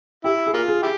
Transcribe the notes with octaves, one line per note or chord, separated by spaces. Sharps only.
E4 G4
G#4
A#3 F4
G#4
E4 G4